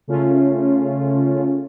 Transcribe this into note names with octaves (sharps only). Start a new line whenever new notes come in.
C#3 A3 C#4 F4